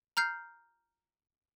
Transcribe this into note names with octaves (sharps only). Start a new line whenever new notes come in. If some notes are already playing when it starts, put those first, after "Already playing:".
A#5 F6 G6 C7